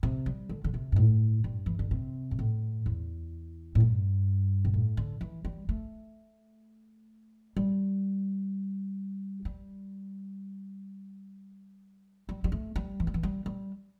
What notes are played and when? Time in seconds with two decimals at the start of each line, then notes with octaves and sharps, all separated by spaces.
0.03 C3
0.26 G3
0.49 D3
0.64 D3
0.74 C3
0.92 G2
0.96 A2
1.44 G2
1.66 E3
1.79 D3
1.91 C3
2.31 G2
2.39 A2
2.86 E2
3.75 A2
3.80 G2
4.65 C3
4.74 A2
4.97 D3
5.21 E3
5.45 G3
5.69 A3
7.57 G3
9.45 G3
12.29 G3
12.44 G3
12.52 A3
12.76 G3
13.00 E3
13.07 G3
13.14 E3
13.23 G3
13.46 G3